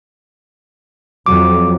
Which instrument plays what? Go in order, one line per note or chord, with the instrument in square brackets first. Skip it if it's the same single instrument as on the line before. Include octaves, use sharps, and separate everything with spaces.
[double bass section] F2 F#3 [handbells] D6